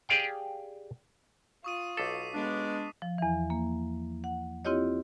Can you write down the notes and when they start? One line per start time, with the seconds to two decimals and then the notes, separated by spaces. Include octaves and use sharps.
0.09 G4 G#4 D5 F5 G5
1.64 F4 C#6 D#6 D#7
1.97 B1 A4 D6 B6 C7
2.34 G#3 B3 D4
3.02 F3
3.18 E2 E3
3.50 A#3
4.24 F#5
4.65 C4 E4 F4 G4 C#5 D#5